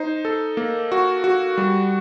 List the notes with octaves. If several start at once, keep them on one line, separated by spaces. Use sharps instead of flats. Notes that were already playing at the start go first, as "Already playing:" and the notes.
Already playing: D#4 C5
A4
A#3
F#4
F#4
G3